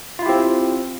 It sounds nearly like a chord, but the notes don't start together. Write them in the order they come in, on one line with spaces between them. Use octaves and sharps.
F4 E4 G4 C4